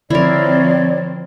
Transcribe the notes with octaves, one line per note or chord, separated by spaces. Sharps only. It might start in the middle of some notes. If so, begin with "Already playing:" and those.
D3 F3 C4 E4 A#4 C#5 D5